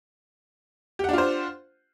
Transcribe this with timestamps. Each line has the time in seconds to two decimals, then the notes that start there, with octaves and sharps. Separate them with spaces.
0.99 G4
1.04 F#5
1.09 D4
1.13 F4
1.18 C5